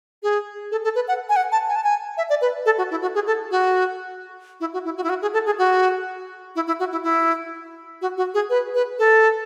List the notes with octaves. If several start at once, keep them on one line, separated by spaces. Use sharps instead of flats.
G#4
A4
A4
B4
F#5
G#5
F#5
A5
G#5
A5
G#5
E5
D5
B4
A4
F#4
E4
F#4
G#4
A4
F#4
E4
F#4
E4
F#4
E4
F#4
G#4
A4
G#4
F#4
E4
E4
F#4
E4
E4
F#4
F#4
G#4
B4
B4
A4